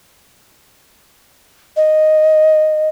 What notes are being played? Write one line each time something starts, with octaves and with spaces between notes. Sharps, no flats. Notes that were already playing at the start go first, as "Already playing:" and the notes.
D#5